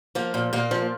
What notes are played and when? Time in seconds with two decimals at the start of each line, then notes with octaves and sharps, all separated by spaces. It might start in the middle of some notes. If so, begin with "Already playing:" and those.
0.15 F3 A#3
0.34 A#2
0.53 A#2 A#3
0.71 F3